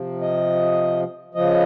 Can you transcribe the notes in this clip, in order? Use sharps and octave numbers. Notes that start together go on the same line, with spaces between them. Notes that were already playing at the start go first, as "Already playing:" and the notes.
Already playing: C3 F3
D#5
C#3 F3 D#5